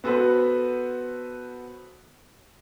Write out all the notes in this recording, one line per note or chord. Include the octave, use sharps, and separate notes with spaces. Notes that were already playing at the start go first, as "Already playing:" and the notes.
B3 F#4 A4 B4 C5